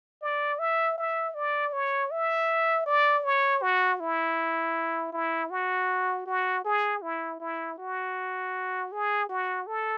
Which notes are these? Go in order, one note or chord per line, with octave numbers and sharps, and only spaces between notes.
D5
E5
E5
D5
C#5
E5
D5
C#5
F#4
E4
E4
F#4
F#4
G#4
E4
E4
F#4
G#4
F#4
A4